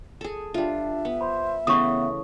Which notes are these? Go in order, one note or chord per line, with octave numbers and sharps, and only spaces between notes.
G#4 A4
G3 D4 F4 E5
B3
C5 B5
C#3 E3 A3 B3 C#6 D#6